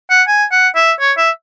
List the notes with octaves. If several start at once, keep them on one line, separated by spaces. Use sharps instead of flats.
F#5
G#5
F#5
E5
C#5
E5